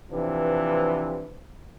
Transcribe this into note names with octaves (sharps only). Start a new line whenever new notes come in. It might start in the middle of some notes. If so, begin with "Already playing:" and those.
C3 E3 F3 D4 B4